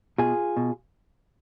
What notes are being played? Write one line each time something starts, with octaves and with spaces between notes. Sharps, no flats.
B2 F4 G#4
B2